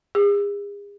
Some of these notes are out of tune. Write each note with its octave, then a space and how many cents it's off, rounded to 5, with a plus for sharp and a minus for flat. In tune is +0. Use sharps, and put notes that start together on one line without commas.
G#4 -40